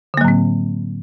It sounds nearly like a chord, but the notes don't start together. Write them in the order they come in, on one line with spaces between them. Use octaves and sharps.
D3 A#3 F#3 A2 C4